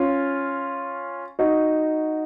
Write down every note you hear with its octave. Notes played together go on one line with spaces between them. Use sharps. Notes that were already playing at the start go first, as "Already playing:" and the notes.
Already playing: C#4 F4
D#4 F#4